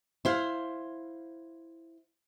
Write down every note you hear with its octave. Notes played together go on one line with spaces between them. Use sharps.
E4 C5 F5